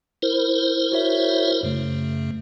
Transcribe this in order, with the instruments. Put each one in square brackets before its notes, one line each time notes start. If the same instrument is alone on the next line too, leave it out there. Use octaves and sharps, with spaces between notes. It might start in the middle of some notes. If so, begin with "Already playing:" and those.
[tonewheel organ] E4 A#4 C5
[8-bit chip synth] F#4 C#5 E5
F#2 C#3 A3